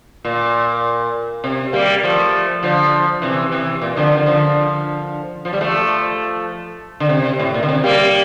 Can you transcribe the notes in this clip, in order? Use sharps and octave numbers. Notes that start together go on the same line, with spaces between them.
A#2
C3
G3 A#3
F3 A3
D3 F3
C3 E3
C3 E3
A#2
D3 F3
D3 F3
D3 F3
F3
G3
F3 A3
D3
C3
A2
A#2
D3
C3
G3 A#3